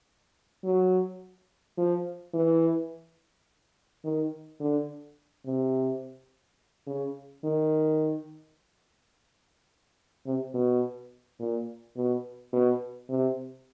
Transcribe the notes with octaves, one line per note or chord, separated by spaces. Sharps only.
F#3
F3
E3
D#3
D3
C3
C#3
D#3
C3
B2
A#2
B2
B2
C3